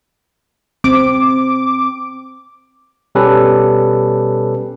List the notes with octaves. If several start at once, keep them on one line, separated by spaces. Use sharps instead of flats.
C4 D6
B2 G3 C#4 G4 A4 B4